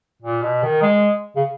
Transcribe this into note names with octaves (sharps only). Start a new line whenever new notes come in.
A#2
B2
D#3
G#3
C#3